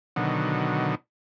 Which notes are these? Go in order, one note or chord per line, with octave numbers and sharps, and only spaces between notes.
B2 D3 D#3 F#3